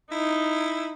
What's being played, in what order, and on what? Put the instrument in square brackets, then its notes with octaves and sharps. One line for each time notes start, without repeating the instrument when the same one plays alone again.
[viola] D#4 [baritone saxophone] E4